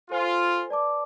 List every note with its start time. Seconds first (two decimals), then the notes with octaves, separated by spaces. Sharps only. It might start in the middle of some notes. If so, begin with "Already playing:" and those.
0.10 F4 A4 C5 G#5
0.69 B4 D5 A5 D6